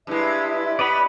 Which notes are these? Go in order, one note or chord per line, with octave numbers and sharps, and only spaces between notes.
G2 G#3 E4 B4 E5
B3 D5 D#5 B5